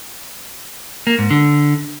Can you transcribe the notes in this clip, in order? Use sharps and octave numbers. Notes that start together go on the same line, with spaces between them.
A#3
G#2
D3